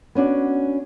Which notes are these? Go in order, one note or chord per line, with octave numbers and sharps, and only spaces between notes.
B3 C#4 D4 F#4